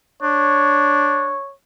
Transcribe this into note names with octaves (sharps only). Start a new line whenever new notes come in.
D4 C#5